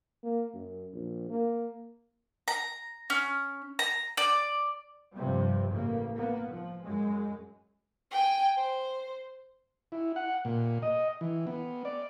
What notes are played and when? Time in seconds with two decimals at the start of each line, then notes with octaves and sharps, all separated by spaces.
0.23 A#3
0.54 F#2
0.93 A#1
1.30 A#3
2.48 A#5
3.10 C#4
3.79 A#5
4.17 D5
5.15 G2 C3 F3 G3
5.70 A1 C#3 A#3
6.15 A#3 B3
6.50 F3
6.83 F#2 G#3
8.11 G5 G#5
8.57 C5
9.92 E4
10.16 F#5
10.45 A#2
10.82 D#5
11.21 E3
11.47 B3
11.85 D5